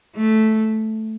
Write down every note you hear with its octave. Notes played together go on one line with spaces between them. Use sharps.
A3